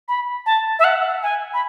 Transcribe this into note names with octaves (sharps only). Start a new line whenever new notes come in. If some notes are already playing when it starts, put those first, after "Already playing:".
B5
A5
E5
F#5
G#5
B5